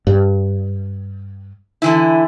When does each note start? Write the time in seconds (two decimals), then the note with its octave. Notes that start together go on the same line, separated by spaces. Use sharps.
0.07 G2
1.82 D3 E3 E4